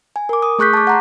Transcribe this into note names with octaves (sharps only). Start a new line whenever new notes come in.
G#5
A#4 D6
D#6
A3 G#4 C#6 F#6 G6 B6
A5 D6
F#5 A#5 C6